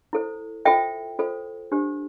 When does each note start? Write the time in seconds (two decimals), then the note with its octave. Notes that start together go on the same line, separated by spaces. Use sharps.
0.13 E4 A4 C5
0.65 F4 A4 C5 E5 G5
1.19 F4 A4 C5
1.72 D4 G4 C5